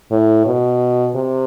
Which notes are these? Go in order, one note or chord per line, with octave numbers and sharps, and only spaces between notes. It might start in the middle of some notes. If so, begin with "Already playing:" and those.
A2
B2
C3